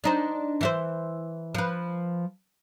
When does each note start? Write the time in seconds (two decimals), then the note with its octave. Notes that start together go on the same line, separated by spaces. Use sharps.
0.04 D4 D#4 C5
0.61 E3 E4 C5
1.55 F3 B4